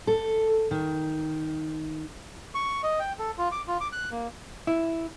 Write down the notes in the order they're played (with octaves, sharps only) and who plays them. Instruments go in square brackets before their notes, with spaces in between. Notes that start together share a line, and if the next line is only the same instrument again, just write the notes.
[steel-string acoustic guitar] A4
D#3
[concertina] C#6
D#5
G5
A4
F4
D6
F4
D6
F#6
A#3
[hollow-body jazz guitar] E4